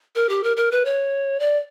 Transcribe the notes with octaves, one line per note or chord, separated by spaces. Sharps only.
A#4
G4
A#4
A#4
B4
C#5
D5